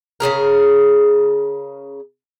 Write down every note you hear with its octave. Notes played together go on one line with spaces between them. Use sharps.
C#3 F3 G#4 A#4